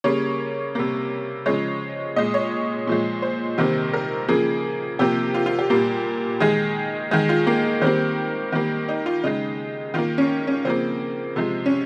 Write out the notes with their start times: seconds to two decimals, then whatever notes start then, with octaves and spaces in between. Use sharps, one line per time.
0.04 C#3 G3 A#3 C#5
0.75 C3 G3 A#3
1.46 C#3 F3 G#3 C#5
2.16 A#2 G#3 D#5
2.34 C#5
2.87 A#2 F3 G#3
3.22 C5
3.58 C3 D#3 G3 A#3
3.93 A#4
4.28 C#3 F3 A#3 G#4
4.99 C3 F3 A#3 G4
5.34 F4
5.46 F4
5.59 G4
5.70 A#2 G3 A#3
6.40 D#3 G#3 G#4
7.11 D#3 G#3 G#4
7.29 F4
7.47 A#3
7.82 D#3 G3 A#3 C4
8.52 D#3 G3 A#3
8.88 D#4
9.06 F4
9.24 C#3 G#3 D#4
9.94 D#3 F4
9.98 A#3
10.18 C#4
10.47 C#4
10.65 C#3 F3 A#3 C4
11.36 C3 F3 G#3
11.66 C#4